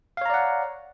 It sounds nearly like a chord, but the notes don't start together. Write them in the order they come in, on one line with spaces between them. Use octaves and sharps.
F5 C#5 A#5 D5 F#5